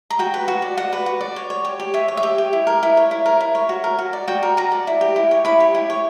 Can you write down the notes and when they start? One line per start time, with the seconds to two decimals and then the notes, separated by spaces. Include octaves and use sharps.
0.10 A#5
0.19 F#4 G5
0.34 B4
0.48 F#4
0.62 D5
0.77 F#4 F#5
0.93 B4
1.06 F#4
1.21 D5
1.36 C#5
1.50 C#5
1.65 G4
1.80 G4
1.94 C#5 E5
2.08 C#5
2.17 E5
2.23 G4
2.38 G4
2.53 E4
2.67 A#4
2.83 E4
2.97 C#5
3.11 E4
3.26 A#4
3.41 E4
3.55 C#5
3.69 F#4
3.84 A#4
3.99 F#4
4.13 D5
4.28 F#4 G5
4.43 A#4
4.57 F#4 A#5
4.72 D5
4.87 E4
5.01 G4
5.16 E4
5.31 C#5
5.45 E4 B5
5.60 G4
5.75 E4
5.90 C#5